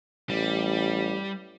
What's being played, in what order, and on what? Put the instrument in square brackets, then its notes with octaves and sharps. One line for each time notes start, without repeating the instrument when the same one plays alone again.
[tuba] A1 [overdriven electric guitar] G3